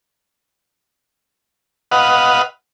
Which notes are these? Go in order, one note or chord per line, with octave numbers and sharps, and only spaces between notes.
B4 D#5 F5 F#5